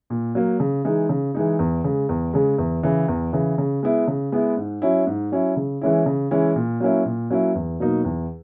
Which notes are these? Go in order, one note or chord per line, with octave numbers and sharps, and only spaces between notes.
A#2
F#3 A#3
C#3
E3 G#3 D#4
C#3
E3 G#3 D#4
E2
C#3 G#3
E2
C#3 G#3
E2
C#3 E3
E2
C#3 E3
C#3
G#3 B3 E4
C#3
G#3 B3 E4
G#2
F#3 C#4 E4
G#2
F#3 C#4 E4
C#3
E3 G#3 C#4 E4
C#3
E3 G#3 C#4 E4
A#2
F#3 A#3 C#4 E4
A#2
F#3 A#3 C#4 E4
E2
B2 F#3 A#3 D#4
E2